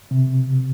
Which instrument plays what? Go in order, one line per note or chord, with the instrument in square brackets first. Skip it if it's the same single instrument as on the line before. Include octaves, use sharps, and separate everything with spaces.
[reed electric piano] C3